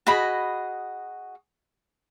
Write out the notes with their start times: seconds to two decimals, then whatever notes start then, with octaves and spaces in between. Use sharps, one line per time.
0.07 F#4 G#4 D#5 B5